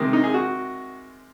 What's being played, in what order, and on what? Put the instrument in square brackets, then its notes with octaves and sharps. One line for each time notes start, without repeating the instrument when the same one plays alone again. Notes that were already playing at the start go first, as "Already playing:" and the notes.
Already playing: [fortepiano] C3 D#3 G#3
D#4
G#4
F#4